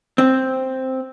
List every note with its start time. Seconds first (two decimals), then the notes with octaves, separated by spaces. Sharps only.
0.18 C4